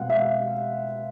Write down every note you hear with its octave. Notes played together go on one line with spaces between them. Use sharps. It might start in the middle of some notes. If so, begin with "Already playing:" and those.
Already playing: B2 G#3 C4 F5 F#5
E5
F5